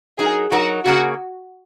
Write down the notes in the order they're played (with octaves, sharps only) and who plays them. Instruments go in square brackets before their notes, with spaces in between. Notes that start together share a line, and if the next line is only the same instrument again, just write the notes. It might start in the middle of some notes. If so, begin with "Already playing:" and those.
[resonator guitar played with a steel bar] F#3 D#4 A#4 [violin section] G#4
[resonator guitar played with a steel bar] F#3 D#4 A#4 [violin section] F#4
[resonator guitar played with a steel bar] C#3 A#3 C#4 G#4 [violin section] F#4